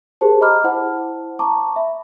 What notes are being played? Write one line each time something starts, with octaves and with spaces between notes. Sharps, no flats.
G4 G#4 A#4 C5 A5
D#5 A#5 B5 D6 F6
E4 C5 F#5 A5
A5 A#5 C#6 D6
E5 B5